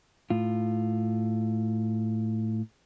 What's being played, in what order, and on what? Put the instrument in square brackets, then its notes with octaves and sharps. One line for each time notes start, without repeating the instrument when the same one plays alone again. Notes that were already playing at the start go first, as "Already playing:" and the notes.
[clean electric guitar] A2 F4